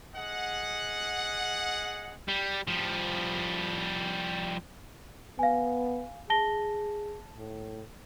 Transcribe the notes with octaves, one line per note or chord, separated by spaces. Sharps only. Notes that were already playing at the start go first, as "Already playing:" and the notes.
G#4 D#5 F#5
G3
F3 G3
B3 F5 G#5
G#4 A5 A#6 G7
A2